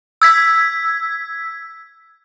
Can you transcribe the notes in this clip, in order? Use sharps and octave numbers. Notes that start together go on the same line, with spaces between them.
E6 G#6 B6